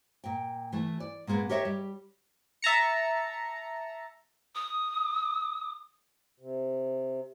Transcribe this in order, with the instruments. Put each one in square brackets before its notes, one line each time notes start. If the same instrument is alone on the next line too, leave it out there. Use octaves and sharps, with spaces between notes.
[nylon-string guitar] A#2 G5
E3 A3
D5
A#2 G#3 A#3 B3
G4 A#4 C#5 D#5 E5
G3
[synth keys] E5 A5 A#5 C#7
[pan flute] D#6
[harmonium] C3